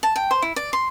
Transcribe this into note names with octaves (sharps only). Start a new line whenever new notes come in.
A5
G5
C5
E4
D5
C6